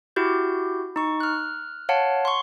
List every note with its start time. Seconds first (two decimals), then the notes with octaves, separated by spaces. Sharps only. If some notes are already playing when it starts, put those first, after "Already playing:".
0.16 E4 F#4 G4 G6
0.96 D#4 C#6
1.20 F6 F#6
1.89 C#5 F5 F#5 A5
2.25 C6 C#6